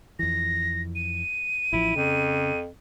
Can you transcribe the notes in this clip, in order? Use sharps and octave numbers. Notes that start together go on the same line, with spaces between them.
F2 E3 A#6
D#7
A1 F3 E4
F2 C#3